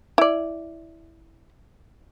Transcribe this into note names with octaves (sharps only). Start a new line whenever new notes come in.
E4 D5